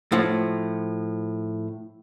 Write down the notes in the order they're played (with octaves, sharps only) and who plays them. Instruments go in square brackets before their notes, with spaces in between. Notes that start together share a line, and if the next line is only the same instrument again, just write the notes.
[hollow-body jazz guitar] A2 F3